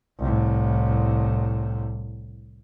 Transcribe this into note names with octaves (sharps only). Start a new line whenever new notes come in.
C2 A2